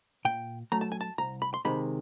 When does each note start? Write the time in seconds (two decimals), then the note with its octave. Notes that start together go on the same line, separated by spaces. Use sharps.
0.25 A#2 G5
0.72 F#3 A3 A#5
0.81 A5
0.92 G#5
1.01 A5
1.18 C2 A#5
1.42 B5
1.54 C6
1.65 C3 D#3 G#3 B5